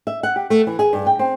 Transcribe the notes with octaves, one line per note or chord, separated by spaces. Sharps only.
E5
F#5
G4
A3
E3
G#4
G2
G5
C4